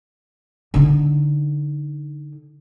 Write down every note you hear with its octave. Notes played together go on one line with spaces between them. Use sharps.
D3 D#4